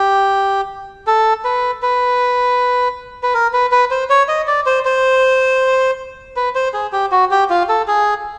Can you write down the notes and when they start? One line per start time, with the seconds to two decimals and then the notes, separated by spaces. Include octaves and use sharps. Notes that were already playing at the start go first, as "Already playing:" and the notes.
Already playing: G4
1.07 A4
1.45 B4
1.82 B4
3.23 B4
3.34 A#4
3.53 B4
3.72 B4
3.91 C5
4.10 C#5
4.28 D#5
4.47 D5
4.66 C5
4.85 C5
6.36 B4
6.55 C5
6.74 G#4
6.93 G4
7.12 F#4
7.31 G4
7.50 F4
7.69 A4
7.88 G#4